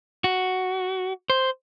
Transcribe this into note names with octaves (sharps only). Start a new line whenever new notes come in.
F#4
C5